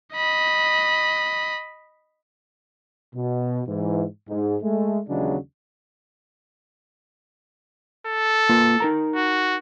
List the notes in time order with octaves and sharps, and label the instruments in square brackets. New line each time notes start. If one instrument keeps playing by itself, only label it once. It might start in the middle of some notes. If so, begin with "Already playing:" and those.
[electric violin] D#5 B5
[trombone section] B2
G#2 E3
G#2
G#3 A3
D#2 C#3 E3 F#3 G#3 D4
[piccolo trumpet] A4
[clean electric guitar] A#3 F4 B4
D#4 A#4 A#5
[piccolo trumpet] F#4